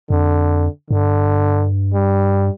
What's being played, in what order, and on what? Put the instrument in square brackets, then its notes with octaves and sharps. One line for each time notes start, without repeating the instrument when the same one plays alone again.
[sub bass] F2 [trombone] D3
[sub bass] G2 [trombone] D3
[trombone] G3